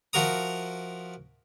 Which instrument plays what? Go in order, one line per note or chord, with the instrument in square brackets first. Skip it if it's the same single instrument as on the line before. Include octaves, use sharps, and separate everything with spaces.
[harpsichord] F3 E4 F#4 A#4 A#5 D#6